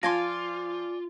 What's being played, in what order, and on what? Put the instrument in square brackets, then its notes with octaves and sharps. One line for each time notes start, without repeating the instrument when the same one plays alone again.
[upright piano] F3 [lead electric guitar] F4 [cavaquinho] D5 G#5 C6 [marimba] F5 A5 A#6